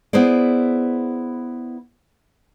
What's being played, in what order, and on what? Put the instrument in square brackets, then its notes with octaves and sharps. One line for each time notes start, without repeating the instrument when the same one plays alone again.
[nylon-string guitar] B3 E4 G#4 C5 D5